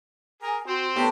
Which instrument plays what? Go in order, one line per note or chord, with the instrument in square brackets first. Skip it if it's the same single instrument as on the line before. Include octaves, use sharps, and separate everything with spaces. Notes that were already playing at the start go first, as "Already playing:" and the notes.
[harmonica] G#4 A#4 [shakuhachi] G#5
[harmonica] C4 C5 [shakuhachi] F#4
[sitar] A2 G4 [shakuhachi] B3